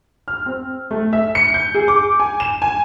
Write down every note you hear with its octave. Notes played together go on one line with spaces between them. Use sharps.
F6
C4
A3
E5
C#7
G6
G#4
D6
G#5
E7
G#5